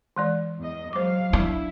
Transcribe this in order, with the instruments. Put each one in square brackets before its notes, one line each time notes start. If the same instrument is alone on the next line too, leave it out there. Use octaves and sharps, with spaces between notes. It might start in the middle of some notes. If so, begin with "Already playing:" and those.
[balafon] E3 G#3 D5
[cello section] E2 D#5
[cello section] F#3 G#3 F5 [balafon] C5 D6
[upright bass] D4 [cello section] E4